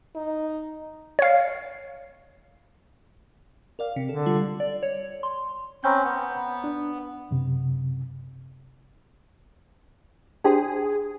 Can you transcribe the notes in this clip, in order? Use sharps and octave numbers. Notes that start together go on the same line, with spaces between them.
D#4
C#5 F5
A#4 D5 F5
C3
D3 A4
G3 F4
D5
C#5
C6
C4 C#4 A#5 B5 G6
B3
D4
F#2 C3
D4 G4 G#4 C5